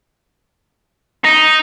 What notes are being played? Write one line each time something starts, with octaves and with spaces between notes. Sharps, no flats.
D#4